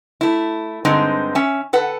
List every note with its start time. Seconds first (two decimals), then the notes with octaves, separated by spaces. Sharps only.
0.21 A3 E4
0.85 G2 D3 G#3 C4 D#4
1.35 C#4 E5
1.73 A4 B4 F#5